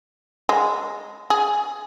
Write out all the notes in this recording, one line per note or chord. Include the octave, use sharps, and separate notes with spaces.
G#3
G#4